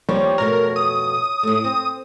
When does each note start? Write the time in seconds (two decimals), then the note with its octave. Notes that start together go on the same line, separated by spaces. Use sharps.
0.09 D#2 F3 G3 C#5
0.38 F2 B2 A3 A#4
0.76 D#6
1.43 A2 A3
1.64 C4